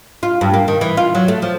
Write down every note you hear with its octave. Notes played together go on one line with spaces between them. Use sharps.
F4
G2
A#3
D#3
E3
F4
F#3
A3
F3